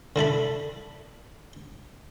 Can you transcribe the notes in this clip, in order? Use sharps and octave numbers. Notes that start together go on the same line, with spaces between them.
D3 E4 A4 B5